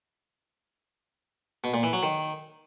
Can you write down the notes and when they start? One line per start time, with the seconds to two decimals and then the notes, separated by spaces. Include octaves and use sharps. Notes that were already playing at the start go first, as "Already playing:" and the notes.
1.64 B2
1.74 A#2
1.83 E3
1.93 F#3
2.03 D#3